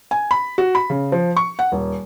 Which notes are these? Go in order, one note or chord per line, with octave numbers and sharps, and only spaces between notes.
G#5
B5
F#4
B5
C#3
F3
C#6
F#5
D#1